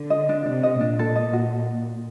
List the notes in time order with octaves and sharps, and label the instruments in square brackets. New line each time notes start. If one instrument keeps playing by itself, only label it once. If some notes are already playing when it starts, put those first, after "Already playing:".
Already playing: [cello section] D3
[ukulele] D#5
D4
[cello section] C3 [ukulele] D4
[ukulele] D#5
[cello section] A#2 [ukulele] D4
[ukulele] A4
D#5
F#4